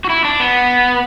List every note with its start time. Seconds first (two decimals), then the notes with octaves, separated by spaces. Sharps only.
0.05 F#4
0.10 E4
0.25 D4
0.40 B3